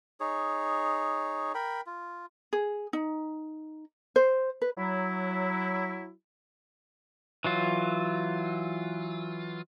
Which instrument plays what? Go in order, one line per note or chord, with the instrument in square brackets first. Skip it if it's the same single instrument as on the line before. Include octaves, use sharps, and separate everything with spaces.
[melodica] D#4 G#4 C#5
A#4 G5 B5
F4
[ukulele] G#4
D#4
C5
B4
[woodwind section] F#3 E4
[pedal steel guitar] E3 F#3 F4